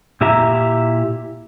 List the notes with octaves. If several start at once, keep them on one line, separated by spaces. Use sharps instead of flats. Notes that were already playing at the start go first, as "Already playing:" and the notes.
A#2 E4 G4 E5 A#5